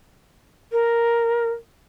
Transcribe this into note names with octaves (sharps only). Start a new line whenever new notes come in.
A#4